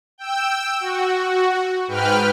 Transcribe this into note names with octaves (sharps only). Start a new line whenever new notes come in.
G5 E6
F#4
G#2 B4 G5 F6